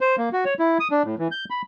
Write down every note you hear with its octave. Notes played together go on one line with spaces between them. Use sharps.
C5
A#3
F#4
C#5
E4
D#6
D4
A2
E3
G6
B5